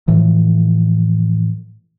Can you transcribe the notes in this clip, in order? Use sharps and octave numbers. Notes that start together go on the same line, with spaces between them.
A2 E3 F3